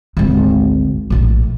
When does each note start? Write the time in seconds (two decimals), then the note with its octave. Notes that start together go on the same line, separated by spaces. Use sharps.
0.17 G#1 D2
1.10 A#1 A2